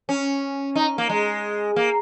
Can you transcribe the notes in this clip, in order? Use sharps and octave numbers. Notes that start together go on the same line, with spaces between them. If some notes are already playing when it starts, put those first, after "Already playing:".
C#4
D#4
A#3
G#3
A#3